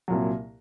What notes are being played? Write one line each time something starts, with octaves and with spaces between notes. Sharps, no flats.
C2 A#2 F#3